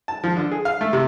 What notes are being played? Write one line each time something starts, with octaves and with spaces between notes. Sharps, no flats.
A5
F3
D3
G#4
F5
A3
C3